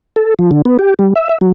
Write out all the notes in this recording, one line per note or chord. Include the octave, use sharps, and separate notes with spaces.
A4
F3
D3
B3
G4
G3
E5
E5
F#3